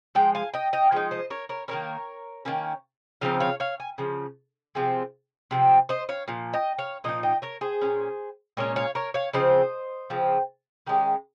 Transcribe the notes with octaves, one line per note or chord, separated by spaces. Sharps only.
F3 G#3 G5
F5 G#5
D#5 G5
D#5 G5
F3 G#3 D#4 G5
C5 D#5
A#4 C#5
A#4 C#5
D#3 A#3 C#4 A#4 C#5
D#3 A#3 C#4
C#3 F3 C4 D#4 F5
C#5 F5
C#5 F5
G#5
C#3 F3
C3 F3 G#3 C4
C3 F3 C4
C5 D#5
C#5 F5
A#2 F3
D#5 G5
C#5 F5
A#2 F3 D#4 D#5
D#5 G5
A#4 C#5
G#4 C5
A#2 G#3 C#4
A#2 G#3 C#4 A#4 C#5
C#5 F5
A#4 C#5
C#5 F5
C#3 F3 C4 C5 D#5
C#3 F3 C4
D#3 G#3 C#4 G4